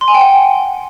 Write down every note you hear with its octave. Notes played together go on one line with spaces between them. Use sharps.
C6
G#5
G5
F#5